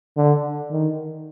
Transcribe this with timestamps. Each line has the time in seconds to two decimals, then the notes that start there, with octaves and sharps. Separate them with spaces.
0.17 D3
0.71 D#3